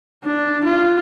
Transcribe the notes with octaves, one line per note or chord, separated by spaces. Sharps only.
D4
F4